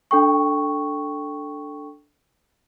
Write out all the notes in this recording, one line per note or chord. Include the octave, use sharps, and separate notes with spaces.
D4 A4 G5 C#6